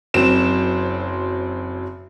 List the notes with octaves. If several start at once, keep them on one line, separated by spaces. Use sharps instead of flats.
F#1 F#3 C4 E7